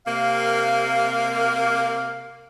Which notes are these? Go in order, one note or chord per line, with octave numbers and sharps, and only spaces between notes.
C3 A#3 F5